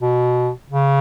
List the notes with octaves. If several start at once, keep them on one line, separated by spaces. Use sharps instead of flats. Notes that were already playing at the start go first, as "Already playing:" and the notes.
B2
C#3